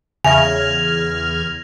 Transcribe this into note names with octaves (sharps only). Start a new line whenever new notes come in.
E2 C#3 E5 G#5 F6 G#6 A#6 F7